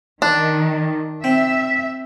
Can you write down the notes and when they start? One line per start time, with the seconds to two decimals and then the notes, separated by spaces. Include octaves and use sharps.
0.22 D#3 D4
1.24 C4 E5